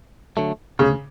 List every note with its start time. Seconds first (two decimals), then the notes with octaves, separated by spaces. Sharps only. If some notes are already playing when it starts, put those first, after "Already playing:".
0.37 D3 F#3 A3
0.79 D2 C#3